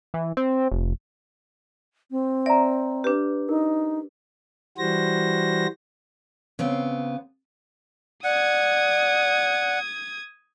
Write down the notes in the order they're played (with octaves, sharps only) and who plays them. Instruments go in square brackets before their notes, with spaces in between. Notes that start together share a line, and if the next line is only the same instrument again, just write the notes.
[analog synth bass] E3
C4
F1
[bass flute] C4
[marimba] D5 [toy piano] E5 A#5
[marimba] D4 G4 [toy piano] B4
[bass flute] D#4 [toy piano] A#4
[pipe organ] E3 G3 F#4 C5 A#6
[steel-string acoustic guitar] C#3 B3 C4
[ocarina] D5 [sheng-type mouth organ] F#5 [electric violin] D#6 G#6